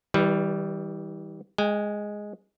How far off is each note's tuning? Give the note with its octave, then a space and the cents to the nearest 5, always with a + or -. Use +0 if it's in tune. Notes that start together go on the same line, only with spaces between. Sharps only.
E3 -40 G3 +0 B4 +0
G#3 +0 G5 +45